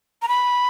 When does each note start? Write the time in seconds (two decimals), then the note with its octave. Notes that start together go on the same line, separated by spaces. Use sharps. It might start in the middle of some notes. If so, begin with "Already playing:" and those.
0.22 A#5
0.28 B5